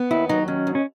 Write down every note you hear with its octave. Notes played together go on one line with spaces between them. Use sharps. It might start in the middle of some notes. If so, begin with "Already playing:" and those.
Already playing: B3
D#2 E4
F#3 D#4
D#3 C#4
D#2
C#4